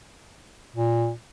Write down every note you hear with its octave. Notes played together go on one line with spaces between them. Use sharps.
A#2